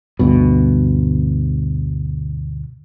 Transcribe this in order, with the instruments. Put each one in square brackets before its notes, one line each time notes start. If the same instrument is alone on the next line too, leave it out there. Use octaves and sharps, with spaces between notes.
[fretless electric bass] D2 G2 B2